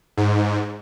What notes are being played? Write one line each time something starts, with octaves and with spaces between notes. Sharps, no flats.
G#2